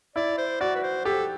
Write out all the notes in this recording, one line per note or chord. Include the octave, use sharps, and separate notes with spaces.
E4 D5
C5
F#4 D5
B4
C5
G4 A4